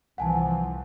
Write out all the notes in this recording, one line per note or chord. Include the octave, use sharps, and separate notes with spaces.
C2 E3 F3 F#5 G#5 A5